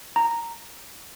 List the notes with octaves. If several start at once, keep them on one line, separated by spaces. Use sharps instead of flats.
A#5